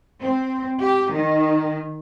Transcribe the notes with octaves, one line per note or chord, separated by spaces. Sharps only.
C4
G4
D#3